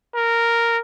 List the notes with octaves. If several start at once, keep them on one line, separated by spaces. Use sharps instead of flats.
A#4